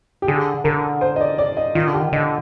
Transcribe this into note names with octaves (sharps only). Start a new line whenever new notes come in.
G4
D3 G#4
D3 A#4
C5
D#5
D5
D5
D#5
D#3 F4
D3
G4
D#3
D3 D#5